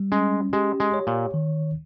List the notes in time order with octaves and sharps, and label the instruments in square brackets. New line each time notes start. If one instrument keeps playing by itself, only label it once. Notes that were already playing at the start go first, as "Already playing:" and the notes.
Already playing: [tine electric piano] G3
[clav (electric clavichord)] G#3 [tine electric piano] C#4
[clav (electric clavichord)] G#3 [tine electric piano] G4
[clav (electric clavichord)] G#3
[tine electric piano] C#5
[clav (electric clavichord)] A#2
[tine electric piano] D#3